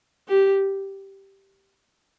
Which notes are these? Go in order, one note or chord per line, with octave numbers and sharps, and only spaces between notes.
G4